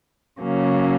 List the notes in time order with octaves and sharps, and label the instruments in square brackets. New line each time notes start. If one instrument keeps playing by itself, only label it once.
[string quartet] C#3 F#3 A#3 C#4